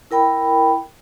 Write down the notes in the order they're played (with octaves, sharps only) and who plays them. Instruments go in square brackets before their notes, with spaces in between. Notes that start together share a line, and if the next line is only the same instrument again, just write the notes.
[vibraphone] E4 A#4 G5 B5